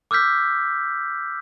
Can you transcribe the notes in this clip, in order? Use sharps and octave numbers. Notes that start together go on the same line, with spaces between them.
D6 E6 F6 G6 B6